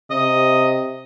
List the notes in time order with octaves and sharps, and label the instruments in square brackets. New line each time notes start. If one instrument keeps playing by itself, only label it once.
[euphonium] C3 [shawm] D#5